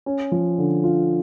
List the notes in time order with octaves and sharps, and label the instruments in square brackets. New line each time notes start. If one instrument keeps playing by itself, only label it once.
[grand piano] C#4
F3
D3
F4